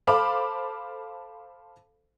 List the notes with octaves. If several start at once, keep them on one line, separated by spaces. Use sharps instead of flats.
A4 C5 F5 B5 D6